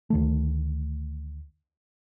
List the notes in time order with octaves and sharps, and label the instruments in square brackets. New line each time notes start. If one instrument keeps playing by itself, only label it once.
[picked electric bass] D2 D#3 A3